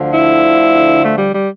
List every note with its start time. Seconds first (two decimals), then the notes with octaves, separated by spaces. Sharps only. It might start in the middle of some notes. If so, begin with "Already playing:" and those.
Already playing: D2 D3 F3
0.11 E4
1.02 A3
1.17 G3
1.32 G3